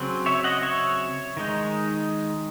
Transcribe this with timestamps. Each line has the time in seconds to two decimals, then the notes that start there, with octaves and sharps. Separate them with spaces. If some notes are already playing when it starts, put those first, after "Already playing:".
Already playing: C#3 F#3 C4
0.26 C#5 E5
0.44 D#5 F#5
0.62 C#5 E5
1.37 D#3 G#3 D#4